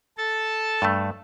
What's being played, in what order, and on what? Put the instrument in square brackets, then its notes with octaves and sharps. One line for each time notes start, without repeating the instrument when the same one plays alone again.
[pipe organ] A4 A5
[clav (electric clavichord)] G2 A3